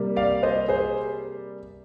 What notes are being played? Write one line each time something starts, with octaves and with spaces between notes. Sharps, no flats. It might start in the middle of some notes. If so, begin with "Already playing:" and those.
Already playing: C3 G3 A#3
D5 F5
C5 D#5
G#4 C5